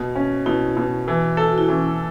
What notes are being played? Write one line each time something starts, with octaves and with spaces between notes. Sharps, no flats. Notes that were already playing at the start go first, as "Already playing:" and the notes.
Already playing: B2
C#4
B2 E4
B2
E3
A4
F#4
E4
E3 C#4